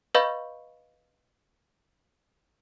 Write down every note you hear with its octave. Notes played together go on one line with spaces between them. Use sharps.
B4 D#5 F5 B5 C#6 G6